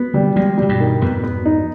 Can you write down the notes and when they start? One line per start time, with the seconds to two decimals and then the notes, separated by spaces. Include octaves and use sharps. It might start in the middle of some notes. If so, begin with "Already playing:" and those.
Already playing: B3
0.13 D3 F3 G3
0.36 F3 G3 G#3
0.58 C3 G3
0.69 G2 B2
0.80 D#3
1.02 F2 G#2 B3
1.24 B3
1.45 D#4